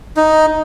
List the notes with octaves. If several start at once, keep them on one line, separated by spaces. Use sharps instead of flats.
D#4